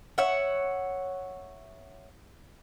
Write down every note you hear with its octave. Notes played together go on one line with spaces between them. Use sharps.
C#5 E5 F#5